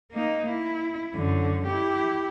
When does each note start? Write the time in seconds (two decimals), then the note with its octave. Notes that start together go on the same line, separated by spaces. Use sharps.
0.12 A#3 D#4
0.49 E4
1.15 F#2 D3
1.67 E4 G4